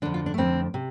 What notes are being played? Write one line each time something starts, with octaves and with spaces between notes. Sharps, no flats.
F2 D3 D4
F4
D4
A3
F2 D3 C4
C3